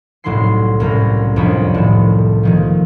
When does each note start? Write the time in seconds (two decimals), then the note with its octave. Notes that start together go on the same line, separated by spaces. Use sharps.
0.24 C2 A2 F#3 D#4 C6 C7
0.80 C2 A2 C#4 A#4
1.36 C2 F2 D4 C#5 D#5 B5
1.74 A2 D#3
2.43 A#2 D#3 F3